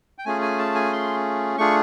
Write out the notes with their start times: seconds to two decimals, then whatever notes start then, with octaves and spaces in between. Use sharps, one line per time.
0.18 G5
0.25 A3 C#4 F4 G#4 G#5
0.42 G#5
0.59 A5
0.75 G#5
0.93 C6
1.58 A3 D4 F4 G#4 C#6